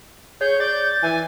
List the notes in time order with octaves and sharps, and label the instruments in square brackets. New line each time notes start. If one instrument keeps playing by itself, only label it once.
[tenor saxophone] G#4 [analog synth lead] C#5 [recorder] G6
[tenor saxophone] D5 [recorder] G6 [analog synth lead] A6
[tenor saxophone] E3 [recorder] G#5